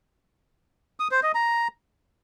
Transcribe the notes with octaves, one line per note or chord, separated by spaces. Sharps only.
D#6
C5
D#5
A#5